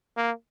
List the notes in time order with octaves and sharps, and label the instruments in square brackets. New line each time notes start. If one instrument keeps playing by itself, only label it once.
[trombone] A#3